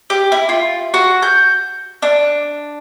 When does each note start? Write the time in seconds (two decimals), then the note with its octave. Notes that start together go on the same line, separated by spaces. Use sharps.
0.10 G4
0.32 E4
0.49 F4
0.94 F#4
1.22 G6
2.02 D4